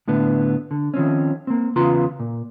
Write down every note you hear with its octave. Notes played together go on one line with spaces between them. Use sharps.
A2 D3 B3
D3
D#3 F3 C4 C#4
A#3 C4
E2 C#3 B3 F4 A#5 C6
A#2